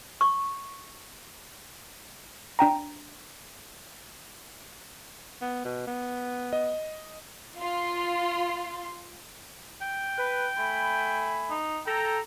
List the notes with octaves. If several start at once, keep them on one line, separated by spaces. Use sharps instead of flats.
C#6
D4 G5 A#5
B3
B2
B3
D#5
F4 C6
G5
B4
A3 G#5 B5
D#4
A4 G5 A#5